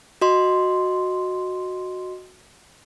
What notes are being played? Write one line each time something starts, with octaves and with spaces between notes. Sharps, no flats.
F#4 D#5 C6